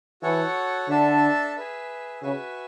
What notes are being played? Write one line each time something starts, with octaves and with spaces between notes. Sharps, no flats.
E3 F#4 A4 C#5 F#5
D3 D4 A4 E5 A5
G#4 B4 E5
C#3 F#4 B4 E5 G#5